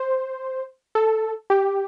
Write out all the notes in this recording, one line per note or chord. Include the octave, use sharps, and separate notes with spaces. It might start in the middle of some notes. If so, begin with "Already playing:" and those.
Already playing: C5
A4
G4